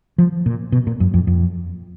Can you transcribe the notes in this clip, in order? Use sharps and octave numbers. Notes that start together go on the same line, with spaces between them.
F3
A#2
B2
A#2
F#2
F2
F2